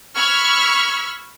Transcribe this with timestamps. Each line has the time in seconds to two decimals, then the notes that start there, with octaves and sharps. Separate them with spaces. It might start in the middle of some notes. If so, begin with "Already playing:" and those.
0.16 B5 C#6 E6 F6 G#6